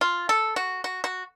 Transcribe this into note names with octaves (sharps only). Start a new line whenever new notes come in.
F4
A4
F#4
F#4
F#4